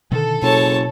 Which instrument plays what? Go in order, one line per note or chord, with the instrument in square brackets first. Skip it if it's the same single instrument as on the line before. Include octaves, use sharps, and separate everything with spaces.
[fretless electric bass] B2 D3 D#3 [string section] A4
[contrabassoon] F#1 [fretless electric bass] B2 [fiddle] C#5 A5